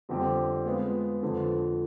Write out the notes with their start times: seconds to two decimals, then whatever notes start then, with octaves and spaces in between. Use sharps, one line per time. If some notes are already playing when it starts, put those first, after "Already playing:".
0.09 F2 D3 G3 C4 G4
0.66 G#3 B3 F4
1.23 F2 D3 F3